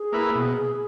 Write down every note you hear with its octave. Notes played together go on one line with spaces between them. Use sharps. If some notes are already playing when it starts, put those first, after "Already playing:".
Already playing: G#4
A#3 E4 B4
B2